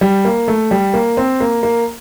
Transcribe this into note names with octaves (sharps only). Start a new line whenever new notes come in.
G3
A#3
A3
G3
A#3
C4
A#3
A#3